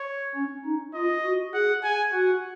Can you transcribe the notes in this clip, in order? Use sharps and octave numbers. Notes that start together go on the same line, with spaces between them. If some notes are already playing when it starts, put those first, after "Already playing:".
Already playing: C#5
C#4
D#4
F4 D#5
F#4
G#4 F#5
G#5
F#4 F#5